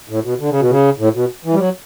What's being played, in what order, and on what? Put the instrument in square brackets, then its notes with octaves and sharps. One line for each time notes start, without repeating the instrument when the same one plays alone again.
[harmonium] A2
B2
D3
C#3
B2
C#3
A2
B2
E3
G3
F#3